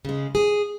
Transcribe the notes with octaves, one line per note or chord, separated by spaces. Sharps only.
C#3 G#3
G#4